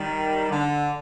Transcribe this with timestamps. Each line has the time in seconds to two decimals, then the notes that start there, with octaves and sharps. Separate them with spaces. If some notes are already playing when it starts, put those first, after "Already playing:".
Already playing: D#3 G3
0.51 D3